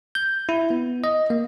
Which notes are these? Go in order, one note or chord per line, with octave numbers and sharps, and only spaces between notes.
G6
E4
B3
D#5
A#3